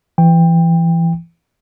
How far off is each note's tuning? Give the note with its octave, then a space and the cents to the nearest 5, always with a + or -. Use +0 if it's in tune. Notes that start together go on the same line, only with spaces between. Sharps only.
E3 +25 G5 +20